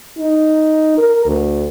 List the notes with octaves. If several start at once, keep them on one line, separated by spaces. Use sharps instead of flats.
D#4
A#4
D2